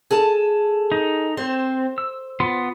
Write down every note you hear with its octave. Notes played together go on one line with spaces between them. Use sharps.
G#4 A4 A5
D#4
C4 C5
E6
B3 F4 C6